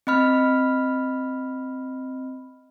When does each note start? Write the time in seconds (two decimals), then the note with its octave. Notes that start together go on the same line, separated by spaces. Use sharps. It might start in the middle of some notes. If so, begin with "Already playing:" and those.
0.07 C4 D#5 B5 F6